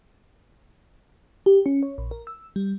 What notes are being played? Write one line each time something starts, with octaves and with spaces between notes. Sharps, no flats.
G4
C#4
C#5
A#1
A#4
E6
G3